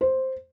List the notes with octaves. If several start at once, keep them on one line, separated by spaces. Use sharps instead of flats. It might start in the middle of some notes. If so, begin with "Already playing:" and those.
C5